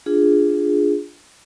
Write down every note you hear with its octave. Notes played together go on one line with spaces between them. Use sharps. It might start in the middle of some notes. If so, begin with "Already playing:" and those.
D4 F4 G#4